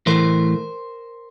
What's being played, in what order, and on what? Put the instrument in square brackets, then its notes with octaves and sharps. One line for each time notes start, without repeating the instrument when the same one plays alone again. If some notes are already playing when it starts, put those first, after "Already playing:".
[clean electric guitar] A2 E3 A3 A#4 C5